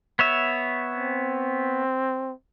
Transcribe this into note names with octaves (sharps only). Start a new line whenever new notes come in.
B3 C#5 E5
C4